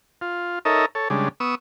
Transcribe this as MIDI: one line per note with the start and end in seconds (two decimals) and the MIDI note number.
0.21 0.59 65
0.65 0.86 63
0.65 0.86 69
0.65 0.86 70
0.65 0.86 73
0.65 0.86 75
0.65 0.86 76
0.95 1.08 69
0.95 1.08 73
1.10 1.29 49
1.10 1.29 55
1.10 1.29 56
1.10 1.29 62
1.40 1.55 59
1.40 1.55 85
1.40 1.55 87
1.40 1.55 88